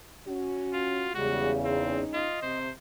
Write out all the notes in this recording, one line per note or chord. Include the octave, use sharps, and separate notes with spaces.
C#4 F#4
F4
E2 C#3 G3 G#3 F#4
G#3 C4 C#4 D#4
F4 D#5
C3 C5